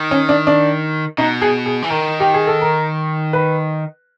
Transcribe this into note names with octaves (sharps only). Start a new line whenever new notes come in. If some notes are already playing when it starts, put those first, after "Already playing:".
Already playing: D#3
C#4
D4
D4
B2 D#4
G#4
G#4
E3
D#3 A#4
G4
G#4
A4
A#4
B4